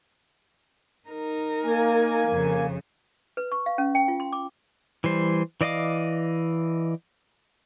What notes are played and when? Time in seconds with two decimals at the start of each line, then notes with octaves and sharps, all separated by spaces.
1.08 D#4 A#4
1.65 A#3 G#5
2.28 F2 C#3
3.37 B4
3.52 C#6
3.66 F5
3.78 C#4
3.95 G5
4.08 F4
4.20 C6
4.33 D6
5.04 E3 G3 C5
5.61 E3 D5 D#5 F5 D6